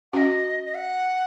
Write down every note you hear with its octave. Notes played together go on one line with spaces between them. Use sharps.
C#4 F#4 D#5 F#5
D#5
F#5